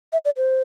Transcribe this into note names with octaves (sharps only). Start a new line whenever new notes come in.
E5
D5
C5